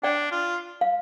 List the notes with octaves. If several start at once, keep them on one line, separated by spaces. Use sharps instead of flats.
D4 D5 G5
F4
F5